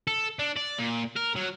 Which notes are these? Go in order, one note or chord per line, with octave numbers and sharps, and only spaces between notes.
A4
D4
D5
A#2
A#4
F#3